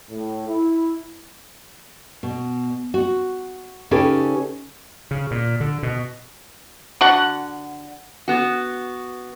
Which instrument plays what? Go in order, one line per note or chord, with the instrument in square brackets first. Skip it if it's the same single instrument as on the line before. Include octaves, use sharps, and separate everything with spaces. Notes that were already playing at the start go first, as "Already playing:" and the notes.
[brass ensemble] A2
E4
[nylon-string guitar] B2
F#4
C#3 C#4 D#4 G4 A4 B4
[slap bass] C#3
A#2
D3
B2
[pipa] D3 F#4 F#5
[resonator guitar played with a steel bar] B3 F#4